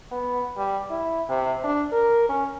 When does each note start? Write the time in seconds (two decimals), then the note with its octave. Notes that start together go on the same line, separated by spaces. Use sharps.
0.11 B3
0.57 G3
0.90 E4
1.29 C3
1.63 D4
1.92 A#4
2.29 C#4